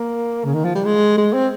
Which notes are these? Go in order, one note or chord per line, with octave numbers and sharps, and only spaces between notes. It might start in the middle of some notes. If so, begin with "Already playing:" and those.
Already playing: A#3
C#3
D#3
F3
G3
G#3
G#3
C4